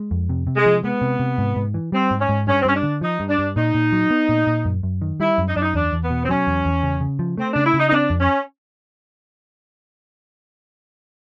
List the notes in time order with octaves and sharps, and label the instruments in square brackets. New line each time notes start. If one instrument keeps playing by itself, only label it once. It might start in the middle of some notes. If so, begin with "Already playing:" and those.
Already playing: [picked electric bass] G#3
F2
C3
C3
[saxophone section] G#3
[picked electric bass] F3
[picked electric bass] G#3 [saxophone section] B3
[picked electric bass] C3
C3
G#2
G#2
E3
[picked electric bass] G3 [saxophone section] C4
[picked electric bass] G#2
[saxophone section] C#4
[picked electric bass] G#2
[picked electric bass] G2 [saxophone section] C#4
[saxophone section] C4
[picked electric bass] G2 [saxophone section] C#4
[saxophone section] D4
[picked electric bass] D3
[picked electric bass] F3 [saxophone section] D#4
[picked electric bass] G2
[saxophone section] D4
[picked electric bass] G2
[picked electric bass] A#2 [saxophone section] D#4
[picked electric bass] A#2
F#3
B3
A#2
A#2
F#2
F#2
D#3
[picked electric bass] G3 [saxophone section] E4
[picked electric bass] F#2
[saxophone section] D#4
[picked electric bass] F#2 [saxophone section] D4
[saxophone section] D#4
[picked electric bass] E2 [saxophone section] D4
[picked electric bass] E2
[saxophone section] B3
[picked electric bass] B2
[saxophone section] C4
[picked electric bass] F#3 [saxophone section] C#4
[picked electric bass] E2
E2
C#3
C#3
F3
[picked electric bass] A3 [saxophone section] C4
[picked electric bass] C#3 [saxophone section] D4
[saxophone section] E4
[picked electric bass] C#3 [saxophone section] D#4
[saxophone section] D#4
[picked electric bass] C4 [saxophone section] D4
[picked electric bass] F2
[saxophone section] C#4